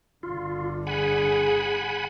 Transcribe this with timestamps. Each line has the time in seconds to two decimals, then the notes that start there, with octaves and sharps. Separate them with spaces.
0.23 G1 D3 F4
0.87 G#4 F#5 G#5 B5